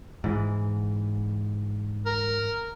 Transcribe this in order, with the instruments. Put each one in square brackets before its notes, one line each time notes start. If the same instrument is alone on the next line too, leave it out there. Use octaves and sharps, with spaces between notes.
[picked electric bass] G#2 E3
[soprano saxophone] A#4